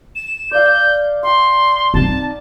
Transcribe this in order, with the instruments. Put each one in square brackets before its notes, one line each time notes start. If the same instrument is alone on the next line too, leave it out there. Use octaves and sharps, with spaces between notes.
[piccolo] E7
[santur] D5 F5 [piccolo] G6
[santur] G5 [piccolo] C6
[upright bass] C4 D#4 [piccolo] A5